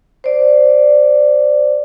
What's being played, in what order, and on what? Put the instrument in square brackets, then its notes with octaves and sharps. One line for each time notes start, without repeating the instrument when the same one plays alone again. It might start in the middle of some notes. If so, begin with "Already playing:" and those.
[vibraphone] C5 D5